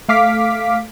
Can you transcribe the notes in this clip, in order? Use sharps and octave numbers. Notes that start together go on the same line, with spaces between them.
A3 F5 D6 B6